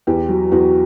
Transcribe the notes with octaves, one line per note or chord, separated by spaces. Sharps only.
E2 G4
F#3
E2 F#4